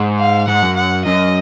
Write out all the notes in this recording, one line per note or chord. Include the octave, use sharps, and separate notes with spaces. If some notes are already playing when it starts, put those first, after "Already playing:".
Already playing: G#2
F5
G#2 F#5
F#2
F#5
F#2 D#5